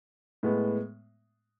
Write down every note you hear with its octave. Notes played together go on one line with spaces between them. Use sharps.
A2 G#3 B3